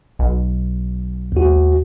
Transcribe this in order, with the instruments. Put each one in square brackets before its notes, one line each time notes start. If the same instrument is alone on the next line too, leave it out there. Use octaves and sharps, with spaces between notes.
[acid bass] B1
[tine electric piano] D#2 F#4